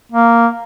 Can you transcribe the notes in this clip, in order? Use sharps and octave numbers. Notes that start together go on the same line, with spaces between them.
A#3